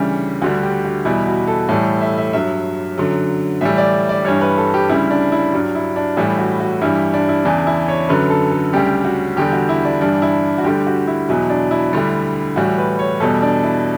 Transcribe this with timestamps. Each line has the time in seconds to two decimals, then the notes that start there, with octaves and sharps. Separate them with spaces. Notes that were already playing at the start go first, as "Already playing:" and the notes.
Already playing: D2 C#3 E3 G3
0.42 D2 D3 G3 F#4
0.63 G4
0.85 F#4
1.05 E2 B2 G3 E4
1.27 F#4
1.47 A4
1.69 A2 E3 G3 A4
2.01 E5
2.17 E5
2.33 G2 F#3 E5
2.98 F#2 D3 F#3
3.61 A2 E3 G3 E5
3.78 D5
4.09 D5
4.25 G2 E3 G3 C#5
4.41 B4
4.58 A4
4.74 G4
4.89 D2 C#3 G3 E4
5.11 D4
5.32 E4
5.53 G2 F#3 D4
5.75 E4
5.96 D4
6.17 A2 E3 G3 E4
6.39 F#4
6.60 F#4
6.81 G2 E3 G3 E4
7.14 D4
7.29 E4
7.45 E2 C#3 E3 D4
7.67 E4
7.88 C#5
8.09 F#2 D3 F#3 B4
8.30 A4
8.52 A4
8.73 D2 C#3 G3 G4
9.05 F#4
9.36 E2 D3 G3 G4
9.53 F#4
9.69 E4
9.85 D4
10.01 G2 E3 G3 D4
10.22 E4
10.58 F#4
10.64 D2 D3 G3 G4
10.87 F#4
11.07 E4
11.29 E2 B2 F#3 E4
11.50 D4
11.71 E4
11.93 D2 D3 G3
12.56 A2 E3 G3 F#4
12.78 B4
12.99 C#5
13.20 E2 B2 G3 A4
13.42 D4
13.63 E4